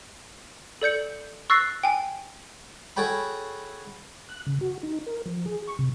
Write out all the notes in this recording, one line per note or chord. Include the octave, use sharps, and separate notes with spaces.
A4 D5 G6 C#7
C#6 E6 F#6 A6 A#6 C7
G5 G#5
F#4 G#4 A4 C#5 G5 B5
F#6
C#3
F#4
D#4
A#4
F3
G#4
C#6
C3